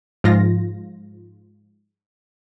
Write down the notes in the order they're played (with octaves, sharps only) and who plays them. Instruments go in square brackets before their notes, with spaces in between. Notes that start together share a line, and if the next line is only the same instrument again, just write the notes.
[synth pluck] G#2 F3 F4 A#6